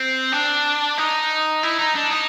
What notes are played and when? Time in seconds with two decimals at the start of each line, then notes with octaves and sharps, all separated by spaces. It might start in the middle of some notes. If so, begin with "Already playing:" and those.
Already playing: C4
0.32 D4
0.98 D#4
1.63 E4
1.79 D#4
1.95 D4
2.11 D#4